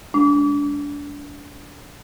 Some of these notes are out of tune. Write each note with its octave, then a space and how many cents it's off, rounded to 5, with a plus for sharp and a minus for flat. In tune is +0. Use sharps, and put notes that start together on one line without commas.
G#3 +0 D4 -25